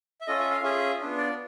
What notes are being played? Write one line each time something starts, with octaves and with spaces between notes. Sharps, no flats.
E5
C#4 F4 A4 D#5
E5
F5
C#4 F4 G#4 E5
B3 D4 F4
D5